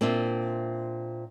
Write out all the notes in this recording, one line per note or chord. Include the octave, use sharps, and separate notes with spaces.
A#2 C4 D4 E5